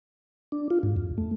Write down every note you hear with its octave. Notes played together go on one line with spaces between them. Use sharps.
D4
F4
G#2
F2
A3